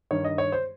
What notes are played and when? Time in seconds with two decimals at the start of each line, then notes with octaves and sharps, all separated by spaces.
0.11 G2 D#3 C#5
0.24 D#5
0.38 C#5
0.52 C5